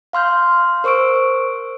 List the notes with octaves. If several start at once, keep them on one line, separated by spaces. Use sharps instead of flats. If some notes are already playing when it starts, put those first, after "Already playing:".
F5 C6 F6 G6
A#4 C5 C#6 E6 D7